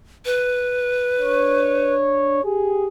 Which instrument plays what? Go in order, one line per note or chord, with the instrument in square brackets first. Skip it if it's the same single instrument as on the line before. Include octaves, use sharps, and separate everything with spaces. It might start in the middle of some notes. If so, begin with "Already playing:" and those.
[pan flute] B4
[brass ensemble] D4 C#5
G4 G#4